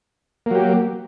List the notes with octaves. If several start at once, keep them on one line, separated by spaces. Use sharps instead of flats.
F#3 A#3 G4